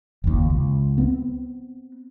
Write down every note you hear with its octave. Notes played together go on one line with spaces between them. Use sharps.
F#1 D#2
C#2
B3 C4